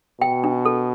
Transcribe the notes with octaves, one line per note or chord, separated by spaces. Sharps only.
B2 G5
D4
A4